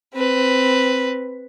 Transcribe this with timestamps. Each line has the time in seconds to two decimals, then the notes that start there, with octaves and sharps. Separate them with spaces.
0.14 C4 B4